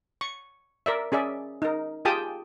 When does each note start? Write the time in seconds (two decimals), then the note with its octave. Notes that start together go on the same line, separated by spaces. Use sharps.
0.21 C#6
0.86 A#4 D5 E5
1.12 C#4 G#4 D5 E5
1.62 D#4 A#4
2.05 F4 G4 G#4 G5 A5 D#6